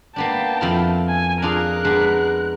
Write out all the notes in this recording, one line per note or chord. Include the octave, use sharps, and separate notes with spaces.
A#3 B3 D4 G5 A5
F2 E4 F4
G#5
D4 F4 G#4 A#4 F#6
G#3 B3 D4